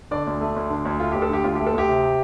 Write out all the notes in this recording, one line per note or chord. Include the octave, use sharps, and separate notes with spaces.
D3 D5
D2
A3
D2
D3
D2
A3 F4
D2 G4
A4
D3 G4
D2 F4
A3 G4
A4
D2 G4
C3